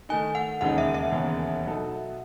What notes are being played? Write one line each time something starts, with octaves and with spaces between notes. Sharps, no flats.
D#3 A3 D#4 G#5
F#5
E1 D#2 C#3 G#3 D#4 F#5
E5
E5
E1 D#2 C#3 E3 B3
B2 F#3 B3 D#4 A4